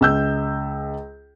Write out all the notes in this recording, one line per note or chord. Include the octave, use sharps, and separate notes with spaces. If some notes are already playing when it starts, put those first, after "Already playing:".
C#2 E6 G6